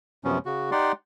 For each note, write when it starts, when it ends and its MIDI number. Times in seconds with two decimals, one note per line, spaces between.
0.25 0.38 42
0.25 0.38 48
0.25 0.38 53
0.25 0.38 59
0.25 0.38 61
0.46 0.71 49
0.46 0.71 66
0.72 0.92 63
0.72 0.92 67
0.72 0.92 74
0.72 0.92 78
0.72 0.92 84